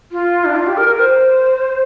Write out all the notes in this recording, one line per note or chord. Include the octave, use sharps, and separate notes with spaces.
F4
D4
F4
G4
A#4
A#4
C5